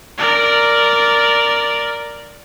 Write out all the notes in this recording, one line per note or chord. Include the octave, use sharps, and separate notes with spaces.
A#4 D5